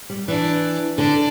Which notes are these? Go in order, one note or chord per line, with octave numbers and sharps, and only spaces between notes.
G3
E3 D4
D3 D4